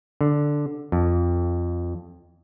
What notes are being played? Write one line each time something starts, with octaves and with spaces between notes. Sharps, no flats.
D3
F2